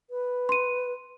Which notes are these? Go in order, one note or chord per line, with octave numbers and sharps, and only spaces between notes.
B4
C6 D#7